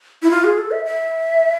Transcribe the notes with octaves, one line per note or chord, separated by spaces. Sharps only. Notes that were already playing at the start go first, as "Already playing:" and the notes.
E4
F4
G#4
A4
E5
E5